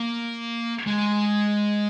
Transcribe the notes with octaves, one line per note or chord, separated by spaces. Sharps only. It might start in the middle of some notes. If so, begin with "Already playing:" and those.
Already playing: A#3
G#3